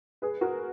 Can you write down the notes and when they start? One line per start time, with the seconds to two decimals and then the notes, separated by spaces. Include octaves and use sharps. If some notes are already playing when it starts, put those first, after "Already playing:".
0.22 G#4 B4
0.41 F#4 A#4